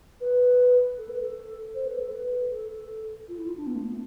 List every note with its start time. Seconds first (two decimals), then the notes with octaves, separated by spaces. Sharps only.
0.21 B4
0.98 A4
1.09 B4
1.20 A4
1.75 C5
1.86 B4
2.00 A4
2.12 B4
2.52 A4
2.70 A4
3.28 F4
3.38 E4
3.47 F4
3.57 D4
3.67 B3
3.75 A3
3.86 B3